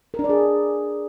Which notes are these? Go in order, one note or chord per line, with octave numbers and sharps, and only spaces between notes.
A#4
D4
D5
G#4